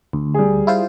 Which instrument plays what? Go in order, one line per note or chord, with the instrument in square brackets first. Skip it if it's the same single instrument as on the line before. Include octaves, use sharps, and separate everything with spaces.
[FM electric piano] D2
[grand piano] G3 G#4
[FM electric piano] E4 F4 C5